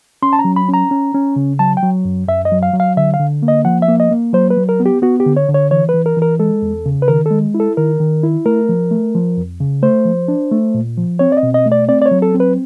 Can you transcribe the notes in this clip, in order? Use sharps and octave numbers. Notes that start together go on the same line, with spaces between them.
C#4 C6
A5
A#5
F#3
B5
C#4
A#5
C#4
C#4
C#3
F#3 A5
G5
F#3
F#2
F#2 E5
D#5
F#3
F5
F#3
F5
D3 E5
F5
D3
A#3
D#5
F3 F#5
E5
A#3
D#5
A#3
F#3 C5
B4
F#3
A#4
B3
G4
B3 F#4
G4
D3
C#5
D3
C#5
E3 C#5
B4
E3
A#4
E3 A#4
G#3 A4
E2
C#3
B4
D#3 A#4
G#3 A4
E4
A4
D#3 A#4
D#3
E4
A3 A#4
F3
A3
F3
F2
C#3
A3 C5
F3
D4
A3
A#2
F3
C4 C#5
D5
D#5
B2
D#5
A3
D5
C4 D5
D5
C#5
F#3
A4
C4
B4